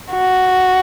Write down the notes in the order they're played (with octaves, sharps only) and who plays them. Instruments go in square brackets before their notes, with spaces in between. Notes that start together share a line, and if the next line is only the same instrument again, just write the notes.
[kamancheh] F#4